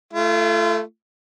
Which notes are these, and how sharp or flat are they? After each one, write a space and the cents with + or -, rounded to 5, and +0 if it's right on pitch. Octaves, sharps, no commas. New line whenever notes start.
A3 +0 F4 -35